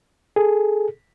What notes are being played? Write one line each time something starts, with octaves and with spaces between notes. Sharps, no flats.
G#4 A4